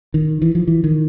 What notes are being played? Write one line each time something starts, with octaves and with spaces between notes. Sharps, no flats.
D#3
E3
F3
E3
D#3